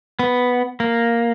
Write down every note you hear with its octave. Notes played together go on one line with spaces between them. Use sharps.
B3
A#3